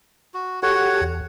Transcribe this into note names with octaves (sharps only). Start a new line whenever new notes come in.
F#4
F#4 G4 A4 C#5 F#5
E2